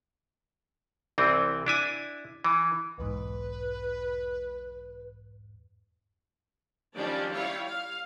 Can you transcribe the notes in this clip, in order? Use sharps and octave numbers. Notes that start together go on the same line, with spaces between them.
C2 E3 C4
D4 E4 G#5
E3
B1 E2 G#2 B4
D#3 F3 G3 C#4 D4 D5
G3 E4 F4 C#5 F5
F5